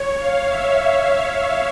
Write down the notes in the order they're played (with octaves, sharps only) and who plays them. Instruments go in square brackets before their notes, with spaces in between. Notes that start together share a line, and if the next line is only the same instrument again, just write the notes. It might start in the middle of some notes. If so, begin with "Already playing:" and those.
Already playing: [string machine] C#5
F5
E5